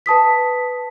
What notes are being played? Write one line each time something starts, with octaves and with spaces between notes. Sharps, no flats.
B4 A5 D#6 B6